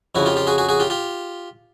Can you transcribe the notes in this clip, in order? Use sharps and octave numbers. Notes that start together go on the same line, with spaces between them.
F2 C#3 F3 E4 F#4
F4 G4
F4 G4
F#4 G#4
F#4 G#4
F#4 G#4
F4 G4
F4 G4